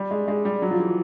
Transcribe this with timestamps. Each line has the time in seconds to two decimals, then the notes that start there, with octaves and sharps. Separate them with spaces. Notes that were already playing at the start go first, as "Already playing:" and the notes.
Already playing: G3
0.11 G#3
0.28 G#3
0.45 G3
0.62 F#3
0.71 F3
0.79 E3